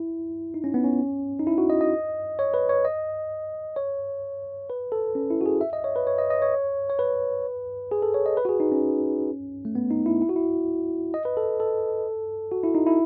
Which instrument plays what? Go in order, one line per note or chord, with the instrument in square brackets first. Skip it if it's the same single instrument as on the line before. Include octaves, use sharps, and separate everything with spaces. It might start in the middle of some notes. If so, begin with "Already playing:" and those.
Already playing: [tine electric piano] E4
D#4
C#4
B3
C#4
D#4
E4
F#4
D#5
D#5
C#5
B4
C#5
D#5
C#5
B4
A4
C#4
E4
F#4
G#4
E5
D#5
C#5
B4
C#5
D#5
D#5
C#5
C#5
B4
G#4
A4
C#5
D#5
B4
F#4
G#4
D#4
C#4
A3
B3
D#4
E4
E4
F#4
E4
D#5
B4
A4
A4
F#4
E4
D#4
E4